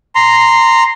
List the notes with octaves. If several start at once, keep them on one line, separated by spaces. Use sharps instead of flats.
A#5 C6